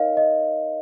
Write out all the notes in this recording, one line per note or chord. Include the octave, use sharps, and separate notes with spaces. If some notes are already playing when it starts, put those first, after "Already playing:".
Already playing: D#4 A#4 C#5 D#5 F5
D#5